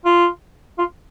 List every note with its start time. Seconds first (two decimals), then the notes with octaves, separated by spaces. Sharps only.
0.05 F4
0.78 F4